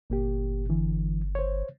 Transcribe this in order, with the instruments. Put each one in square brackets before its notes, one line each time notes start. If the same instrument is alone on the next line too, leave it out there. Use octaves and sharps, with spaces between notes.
[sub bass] G1 [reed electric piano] A#2 A#3 G4
[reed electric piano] D3 E3
C5 C#5